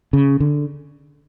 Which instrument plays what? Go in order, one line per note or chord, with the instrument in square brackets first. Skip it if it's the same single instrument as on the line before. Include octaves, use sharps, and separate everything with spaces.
[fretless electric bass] C#3
D3